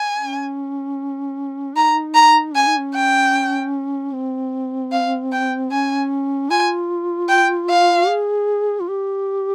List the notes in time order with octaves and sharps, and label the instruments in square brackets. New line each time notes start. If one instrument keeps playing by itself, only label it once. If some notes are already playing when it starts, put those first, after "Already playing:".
Already playing: [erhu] G#5
[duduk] C#4
[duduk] D#4 [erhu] A#5
[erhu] A#5
[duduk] C#4 [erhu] G#5
[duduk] D#4
C#4
[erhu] G5
[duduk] C4
[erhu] F5
G5
[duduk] C#4 [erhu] G#5
[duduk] F4 [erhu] G#5
[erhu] G5
F5
[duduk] G#4
F4
G4